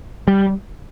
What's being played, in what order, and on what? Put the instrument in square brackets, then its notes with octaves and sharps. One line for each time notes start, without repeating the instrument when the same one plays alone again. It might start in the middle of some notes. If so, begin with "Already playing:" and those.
[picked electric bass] G3